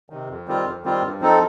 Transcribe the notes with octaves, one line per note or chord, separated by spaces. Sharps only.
C3 D#3
F2
D#3 G3 C4 F4
F2
D#3 G3 C4 F4
G2
F3 C4 D#4 A4